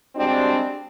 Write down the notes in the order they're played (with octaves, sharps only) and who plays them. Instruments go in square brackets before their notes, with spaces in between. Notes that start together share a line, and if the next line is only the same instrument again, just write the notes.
[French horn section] G3 G#3 C4 D4 F#4